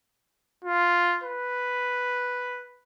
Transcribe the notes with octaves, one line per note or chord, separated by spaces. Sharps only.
F4
B4